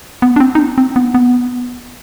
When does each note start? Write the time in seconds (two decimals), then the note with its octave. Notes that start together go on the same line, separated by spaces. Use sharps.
0.22 B3
0.36 D4
0.40 C4
0.55 D#4
0.59 D4
0.78 C4
0.96 B3
1.15 B3